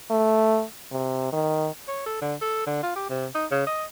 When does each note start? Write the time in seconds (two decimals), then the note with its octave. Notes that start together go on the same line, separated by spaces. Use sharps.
0.10 A3
0.92 C3
1.33 D#3
1.88 C#5
2.06 A4
2.21 D3
2.41 A4
2.67 D3
2.83 F4
2.96 G4
3.10 C3
3.35 D#4
3.51 C#3
3.67 D#5